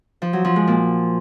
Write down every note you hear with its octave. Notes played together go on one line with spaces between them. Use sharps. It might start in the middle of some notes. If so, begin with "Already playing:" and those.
F3
F#3
F3
G#3
A#2